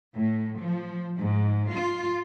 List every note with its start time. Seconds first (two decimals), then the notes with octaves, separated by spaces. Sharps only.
0.17 A2
0.60 F3
1.19 G#2
1.70 F4